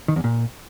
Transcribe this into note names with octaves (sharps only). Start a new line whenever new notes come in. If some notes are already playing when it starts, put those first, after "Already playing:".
D#3
E2
A#2